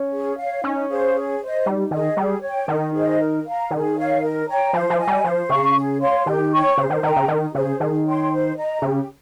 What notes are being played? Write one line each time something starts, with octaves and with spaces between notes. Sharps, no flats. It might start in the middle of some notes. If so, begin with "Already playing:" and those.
Already playing: C#4
G#4
C#5 F5
C#4 D#4
G#4 C5 F5
G#4
C5 D#5
G3 D#4
D#3 G#4 D#5
G3 G#4
C#5 G5
D#3 D#4
G#4 C5 D#5
A#4
F5 A#5
D#3 G#4
C#5 F5
A#4
C#5 G5 A#5
F3 C5
F3
D#5 G#5
G3
F3 C5
C#3 F5 A#5 C#6
G#4
C#5 F5 C6
D#3 G4
C#5 G5 C#6
C#3 C5
D#3
D#3 G5 A#5
C#3
D#3 D#4
C#3 G#4 C5
D#3 G#4
C#5 G5 C6
C5
D#5 A#5
C#3 G4